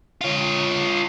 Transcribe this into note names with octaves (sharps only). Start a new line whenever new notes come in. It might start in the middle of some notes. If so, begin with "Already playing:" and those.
F4 C#5